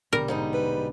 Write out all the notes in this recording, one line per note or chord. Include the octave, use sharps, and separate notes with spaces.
A#1 B2 D3 G3 A#4
G#2 G3 D#4
B4